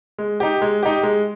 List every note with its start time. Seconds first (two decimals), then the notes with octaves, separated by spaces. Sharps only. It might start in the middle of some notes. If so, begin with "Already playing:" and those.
0.18 G#3
0.40 D#4 G4
0.62 G#3
0.83 D#4 G4
1.03 G#3